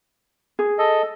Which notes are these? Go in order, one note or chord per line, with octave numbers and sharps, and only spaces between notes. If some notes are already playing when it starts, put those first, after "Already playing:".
G#4
A4 D#5